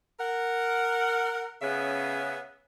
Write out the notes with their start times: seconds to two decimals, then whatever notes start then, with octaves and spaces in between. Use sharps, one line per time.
0.20 A#4 F#5
1.62 C#3 B3 C#4 G#4 E5